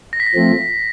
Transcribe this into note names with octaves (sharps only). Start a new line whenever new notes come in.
A#6
B6
A#6
F3 A3 C4